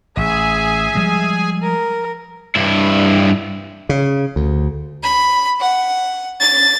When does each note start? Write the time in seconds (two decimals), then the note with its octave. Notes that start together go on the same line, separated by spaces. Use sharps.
0.17 A1 G#4 E5 G#5
0.95 F3 G3 G#3
1.63 A#4
2.56 G2 E4
3.89 C#3
4.36 D2
5.03 B5
5.60 F#5
6.40 A6